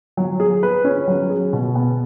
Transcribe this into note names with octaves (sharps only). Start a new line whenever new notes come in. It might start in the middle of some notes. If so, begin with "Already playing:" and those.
F#3
G#4
B4
C#4
F#3
G#4
B2
B3